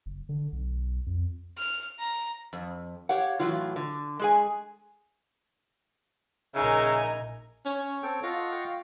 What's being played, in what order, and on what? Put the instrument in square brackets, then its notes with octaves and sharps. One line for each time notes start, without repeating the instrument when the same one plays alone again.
[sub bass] F#1
D3
B1
F2
[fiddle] F6
A#5
[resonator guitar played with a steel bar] F2
G4 C#5 F5 F#5
A2 E3 F#3 F4
D3
G#3 G#4 G#5
[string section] A#1 G#5 [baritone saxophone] C#3 [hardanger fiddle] D#4 A#4 [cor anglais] E5
[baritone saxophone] C#4 [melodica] C#5
[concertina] C4 A4 G5
[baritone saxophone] F4 [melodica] A4 [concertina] D#5 F#5 C#6
[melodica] F5 G5